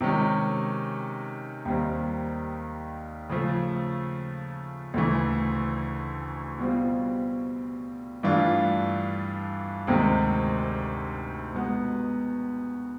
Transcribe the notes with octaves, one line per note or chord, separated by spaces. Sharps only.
C3 D#3 G#3 C#4
D#2 D#3 G3 C4
C#3 F3 A3
D2 C#3 E3 A3
B2 G3 C4 F4
G2 E3 A3 D4 F4
D2 C3 D#3 G#3 C4
B2 G#3 B3